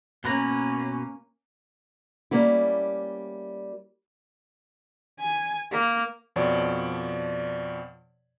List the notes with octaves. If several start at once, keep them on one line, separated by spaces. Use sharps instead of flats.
B2 A#3 C#4 B4 A#5
G3 A#3 C#4 E4
G#5
A#3
F2 B2 F3 C#5 D5